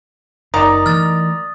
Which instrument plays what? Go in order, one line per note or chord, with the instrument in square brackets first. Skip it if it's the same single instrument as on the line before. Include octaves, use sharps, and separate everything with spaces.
[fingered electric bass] F#1 [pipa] D#3 [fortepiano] D5 A#5 [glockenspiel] D#6
[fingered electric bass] E3 A3 [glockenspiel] F6 A6